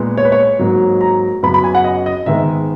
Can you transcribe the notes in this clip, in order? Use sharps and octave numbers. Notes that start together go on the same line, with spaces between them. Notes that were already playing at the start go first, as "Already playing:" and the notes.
Already playing: A#2 G#3 B3
C#5
B4
C#5
G#2 F#3 A#3
A#5
F#2 C#3 F#3 B3 B5
B5
G#5
F#5
D#5
D#5
G#2 D#3 G#3 B3 E5